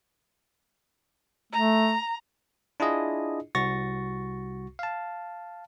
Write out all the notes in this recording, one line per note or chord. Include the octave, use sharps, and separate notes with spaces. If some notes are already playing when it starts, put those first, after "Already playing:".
A3 A#5
D4 E4 F4 G#4 D#5
C2 F#4 C#6 A6 A#6
F5 A5